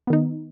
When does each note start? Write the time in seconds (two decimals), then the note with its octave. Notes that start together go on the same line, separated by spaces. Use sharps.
0.07 B3
0.10 D#3
0.13 D#4